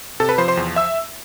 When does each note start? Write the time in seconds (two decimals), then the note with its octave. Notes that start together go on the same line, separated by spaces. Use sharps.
0.20 C3 A4 A5
0.29 B4 B5
0.38 F3 C5 C6
0.48 C5 C6
0.57 E2
0.76 E5 E6